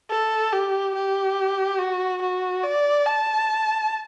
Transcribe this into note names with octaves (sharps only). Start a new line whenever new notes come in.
A4
G4
G4
F#4
F#4
D5
A5